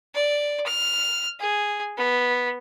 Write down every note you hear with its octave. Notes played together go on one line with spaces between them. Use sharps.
D5
F6
G#4
B3